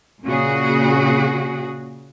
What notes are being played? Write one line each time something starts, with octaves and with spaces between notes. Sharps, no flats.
A#2 C#3 F#4 G#4